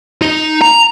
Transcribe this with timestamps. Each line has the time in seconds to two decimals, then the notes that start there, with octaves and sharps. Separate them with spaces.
0.22 D#4
0.62 A#5